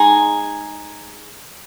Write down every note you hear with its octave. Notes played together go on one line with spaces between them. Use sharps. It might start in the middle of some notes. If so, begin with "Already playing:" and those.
Already playing: G#3 D#4 G#4